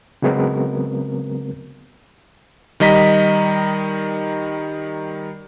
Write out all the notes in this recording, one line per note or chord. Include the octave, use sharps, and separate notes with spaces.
C#3 F#3 G#3 B3 C4 A#4
D#3 G3 D#5 A#5 B6